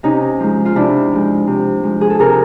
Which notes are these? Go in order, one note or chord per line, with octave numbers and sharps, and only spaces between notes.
C3 C#4 D#4
F3 G#3
F4
C3 D4 E4
F3 G#3
C3
F3 G#3
G#4
A4
C3 G#4 A#4